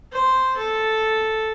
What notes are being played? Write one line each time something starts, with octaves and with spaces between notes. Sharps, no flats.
C5
A4